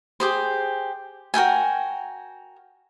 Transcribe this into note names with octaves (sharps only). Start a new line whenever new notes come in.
G4 G#4 C5
F#4 A#4 G5 G#5